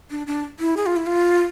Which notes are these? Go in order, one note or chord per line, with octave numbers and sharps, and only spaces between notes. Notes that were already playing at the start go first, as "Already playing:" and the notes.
D4
D4
E4
G#4
F4
E4
F4